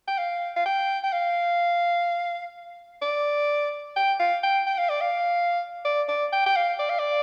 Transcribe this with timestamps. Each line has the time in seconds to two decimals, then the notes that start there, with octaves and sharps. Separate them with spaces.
0.08 G5
0.18 F5
0.56 F5
0.66 G5
1.03 G5
1.13 F5
3.02 D5
3.97 G5
4.20 F5
4.43 G5
4.67 G5
4.78 F5
4.90 D5
5.01 F5
5.85 D5
6.09 D5
6.33 G5
6.46 G5
6.56 F5
6.79 D5
6.90 F5
6.99 D5